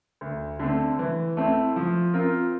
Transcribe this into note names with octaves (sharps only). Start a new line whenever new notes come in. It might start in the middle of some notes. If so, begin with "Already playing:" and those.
D2
D3 A3 C4
E3
A3 C4 E4
F3
C4 F4 A#4